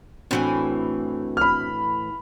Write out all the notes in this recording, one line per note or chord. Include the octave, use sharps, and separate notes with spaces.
A2 E3 C4 D4 F#4 G#5
B5 F6